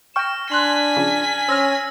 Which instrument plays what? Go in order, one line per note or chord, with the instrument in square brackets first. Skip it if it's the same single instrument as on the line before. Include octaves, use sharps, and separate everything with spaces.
[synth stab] G5 C#6 [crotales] F6 A#6 [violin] E7
[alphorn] D4 [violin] G#5 B6 [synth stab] C6 F#6 [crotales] F#7
[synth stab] C#3 F3
[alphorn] C#4 [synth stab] C5 F6 [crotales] E6 A#6